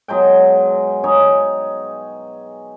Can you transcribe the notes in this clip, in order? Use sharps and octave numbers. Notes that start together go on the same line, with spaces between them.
B2 F#3 G#3 G5
D#4 G#4 C#5 G5